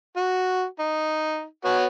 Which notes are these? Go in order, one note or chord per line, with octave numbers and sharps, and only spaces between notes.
F#4
D#4
B3 F#4 C#5